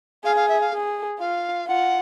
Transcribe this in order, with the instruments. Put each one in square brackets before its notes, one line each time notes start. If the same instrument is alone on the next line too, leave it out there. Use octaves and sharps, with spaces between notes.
[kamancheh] G#4 [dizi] F5
[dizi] F5
E5
F5
[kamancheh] G#4
[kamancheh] F4 [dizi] F5
[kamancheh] F4 [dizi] F#5